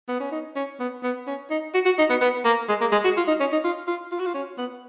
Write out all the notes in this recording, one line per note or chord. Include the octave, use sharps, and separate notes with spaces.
B3
C#4
D#4
C#4
B3
B3
C#4
D#4
F#4
F#4
D#4
B3
B3
A#3
G#3
A#3
G#3
F#4
F4
D#4
C#4
D#4
F4
F4
F4
F#4
F4
C#4
B3